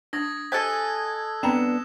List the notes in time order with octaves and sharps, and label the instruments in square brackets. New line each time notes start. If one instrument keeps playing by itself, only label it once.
[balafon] D4 [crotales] D#6 G#6 A#6
[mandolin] A4 D#5 G#5 [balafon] C5 [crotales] E6 F#6 B6
[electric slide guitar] B3 D4 [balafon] C4 A#5 B5 [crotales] E7